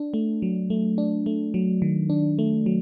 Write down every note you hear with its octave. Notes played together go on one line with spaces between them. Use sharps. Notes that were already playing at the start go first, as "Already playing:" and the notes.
Already playing: D4
A3
F#3
A3
D4
A3
F#3
D#3
D4
A3
F#3